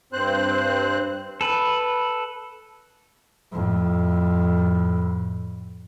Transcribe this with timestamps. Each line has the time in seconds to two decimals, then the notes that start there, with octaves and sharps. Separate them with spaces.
0.13 G2 C4 C5 F#6
1.41 A4 B4
3.52 F2 A2